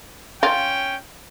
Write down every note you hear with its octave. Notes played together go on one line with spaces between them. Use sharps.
C#4 F4 G5